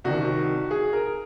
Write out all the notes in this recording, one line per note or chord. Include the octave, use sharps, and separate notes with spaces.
C2 C3 D#3 F#4
G#4
A#4